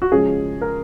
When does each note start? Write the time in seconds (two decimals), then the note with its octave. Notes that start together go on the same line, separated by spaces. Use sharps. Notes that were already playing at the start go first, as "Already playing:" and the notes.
0.02 F#4
0.12 C#3 F3 G#3 C#4 G#4
0.61 A#4